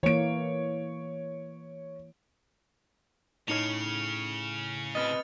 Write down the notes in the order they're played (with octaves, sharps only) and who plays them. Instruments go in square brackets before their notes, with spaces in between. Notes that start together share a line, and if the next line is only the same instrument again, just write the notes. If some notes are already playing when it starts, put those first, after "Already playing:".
[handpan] E3 A#3 [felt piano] C#5 D7
[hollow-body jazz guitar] A2 D#4 C#5 [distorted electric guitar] C#3 [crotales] F6 C#7 F7
[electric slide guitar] C4 B4 D#5 [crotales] F6 A6